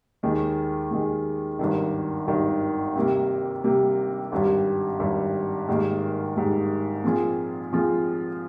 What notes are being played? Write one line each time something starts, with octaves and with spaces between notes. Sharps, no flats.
D#2 D#3 G#3
D#2 D#3 G#3
G#1 G2 D#3
G#1 G2 D#3
C3 G3 A#3
C3 G3 A#3
G#1 G2 G3
G#1 G2 G3
G#2 D#3 G3 A#3
G#2 D#3 G3 A#3
A#2 F3 C4 F4 G#4
A#2 F3 C4 F4 G#4